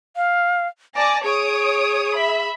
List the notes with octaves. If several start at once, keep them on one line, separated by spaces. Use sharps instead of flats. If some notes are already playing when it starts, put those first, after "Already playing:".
F5
D5 G#5 A5 A#6
G#4 C#5 D#6 D7
E5 B5